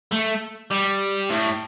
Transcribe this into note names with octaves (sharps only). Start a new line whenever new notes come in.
A3
G3
A2